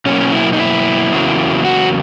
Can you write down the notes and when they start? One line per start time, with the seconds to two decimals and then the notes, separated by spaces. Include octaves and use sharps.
0.06 B2 F#3 A#3 C#4
0.32 E4
0.53 D#4
0.59 E4
1.12 E2 C#3 F#3 A#3
1.65 F#4